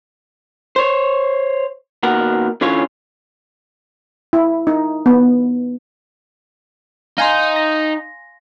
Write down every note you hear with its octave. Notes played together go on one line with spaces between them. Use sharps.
C5 C#5
D#2 B2 A#4 F#5
D3 E3 C#4 F4 C#5
E4
D#4
B3
D#4 F5 G#5 C6
A#6